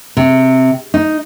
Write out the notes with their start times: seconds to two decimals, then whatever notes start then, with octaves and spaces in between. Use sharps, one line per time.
0.17 C3
0.94 D#4